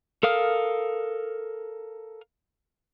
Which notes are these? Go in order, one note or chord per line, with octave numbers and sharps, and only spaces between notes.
A4 A#4 F5 D#6 F6